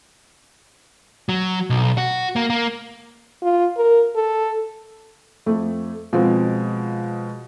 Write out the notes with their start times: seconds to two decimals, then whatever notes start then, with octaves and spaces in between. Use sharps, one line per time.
1.29 F#3
1.70 B1
1.98 F#4
2.36 A#3
2.50 A#3
3.43 F4
3.77 A#4
4.16 A4
5.46 F2 A3
6.13 B2 F3 G#3 C4